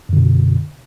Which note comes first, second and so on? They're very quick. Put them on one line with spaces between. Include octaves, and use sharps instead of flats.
F#2 D3 B2